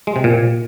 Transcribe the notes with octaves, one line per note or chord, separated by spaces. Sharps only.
G#3
C3
A#2